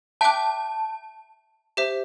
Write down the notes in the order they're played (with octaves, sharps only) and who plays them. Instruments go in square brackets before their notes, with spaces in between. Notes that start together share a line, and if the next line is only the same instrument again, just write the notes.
[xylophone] E5 G5 D6 F#6 [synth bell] A5
[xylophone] G4 C5 E5